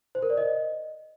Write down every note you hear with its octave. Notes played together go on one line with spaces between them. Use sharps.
C5
A#4
D5
D#5